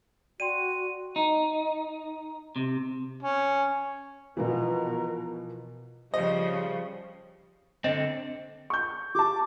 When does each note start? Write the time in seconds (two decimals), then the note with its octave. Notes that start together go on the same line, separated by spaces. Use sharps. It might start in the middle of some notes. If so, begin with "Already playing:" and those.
0.40 F#4 D5 G5 C6 D#7
1.16 D#4
2.56 C3
3.23 C#4
4.37 B2 E3 F3 A#4
6.14 C#3 F3 G3 C5 D#5
7.84 D3 C4 D#5
8.70 C#6 G6
9.15 G4 A5 D6